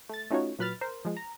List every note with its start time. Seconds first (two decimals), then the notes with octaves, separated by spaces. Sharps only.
0.09 A3 A6
0.31 A3 C#4 D#4 F4 F#4 C#5
0.59 A#2 F#3 B4 B5 F6 A6
0.81 A#4 C5
1.05 F3 G#3
1.17 A#5